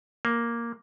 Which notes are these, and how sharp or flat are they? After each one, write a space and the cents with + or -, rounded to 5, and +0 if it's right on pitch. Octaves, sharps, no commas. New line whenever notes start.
A#3 +5